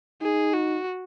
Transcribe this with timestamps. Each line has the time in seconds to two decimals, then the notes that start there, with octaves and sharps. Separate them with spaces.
0.22 D#4 G#4
0.53 F#4